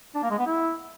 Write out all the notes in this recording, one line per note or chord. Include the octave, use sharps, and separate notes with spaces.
D4
A#3
G#3
B3
E4